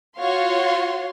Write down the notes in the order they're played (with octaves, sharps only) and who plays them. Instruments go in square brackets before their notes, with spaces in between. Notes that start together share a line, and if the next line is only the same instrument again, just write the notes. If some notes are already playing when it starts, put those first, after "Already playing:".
[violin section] F4 F#4 C#5 F5 C6